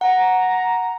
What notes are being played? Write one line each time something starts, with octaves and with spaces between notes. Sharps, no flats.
F#5 A#5